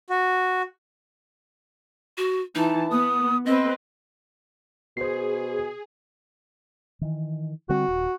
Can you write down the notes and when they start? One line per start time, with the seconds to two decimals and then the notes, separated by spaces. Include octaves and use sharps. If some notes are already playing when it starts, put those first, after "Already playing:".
0.10 F#4
2.18 F#4
2.55 E3 D#4 A5
2.91 B3 D#6
3.46 C4 B4 D#5
4.97 B2 G#4 C5 C7
7.01 D#3 E3
7.69 D3 G3 C4 F#4
7.88 D#1